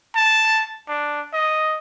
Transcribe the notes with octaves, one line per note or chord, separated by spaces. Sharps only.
A5
D4
D#5